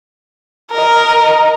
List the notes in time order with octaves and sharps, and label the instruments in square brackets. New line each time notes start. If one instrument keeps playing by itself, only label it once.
[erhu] A#4 [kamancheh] D#5 A#5